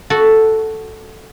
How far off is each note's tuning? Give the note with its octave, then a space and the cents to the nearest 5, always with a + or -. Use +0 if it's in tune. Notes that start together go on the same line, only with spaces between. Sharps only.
F#4 +0 A4 +0